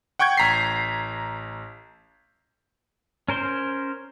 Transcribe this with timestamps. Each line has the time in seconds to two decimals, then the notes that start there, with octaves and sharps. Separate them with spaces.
0.19 F#5 G5 C#6 G6 G#6
0.37 A1 A#5 B6 C7
3.28 C#4 A#4 C5 C6